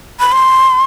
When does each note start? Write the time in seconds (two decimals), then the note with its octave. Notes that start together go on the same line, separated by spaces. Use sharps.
0.19 B5
0.32 C6